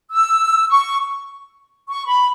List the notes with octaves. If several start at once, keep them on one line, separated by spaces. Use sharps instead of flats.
E6
C#6
C#6
B5